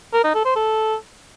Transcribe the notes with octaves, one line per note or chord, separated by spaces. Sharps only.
A#4
D#4
A4
C5
A4